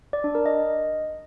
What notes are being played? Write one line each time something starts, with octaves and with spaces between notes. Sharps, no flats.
D5
D4
A#4
D#5